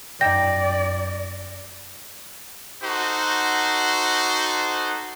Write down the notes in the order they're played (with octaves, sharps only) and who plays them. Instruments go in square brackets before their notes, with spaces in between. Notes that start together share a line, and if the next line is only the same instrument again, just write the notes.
[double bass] F#2 [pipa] D#4 E5 G5 [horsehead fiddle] D5 [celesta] A#6
[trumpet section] D#4 F#4 A4 C5